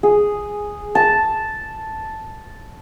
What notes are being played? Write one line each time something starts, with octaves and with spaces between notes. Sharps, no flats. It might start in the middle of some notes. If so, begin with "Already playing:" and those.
G#4
A5